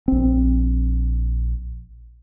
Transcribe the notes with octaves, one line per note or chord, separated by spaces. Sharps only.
A#1 C4